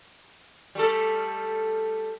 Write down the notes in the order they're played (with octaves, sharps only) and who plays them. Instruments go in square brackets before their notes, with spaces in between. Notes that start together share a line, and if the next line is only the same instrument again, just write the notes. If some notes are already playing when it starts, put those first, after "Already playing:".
[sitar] G3 A3 A4